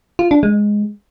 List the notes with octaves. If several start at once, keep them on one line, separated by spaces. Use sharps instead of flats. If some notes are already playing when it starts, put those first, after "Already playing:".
F4
D4
G#3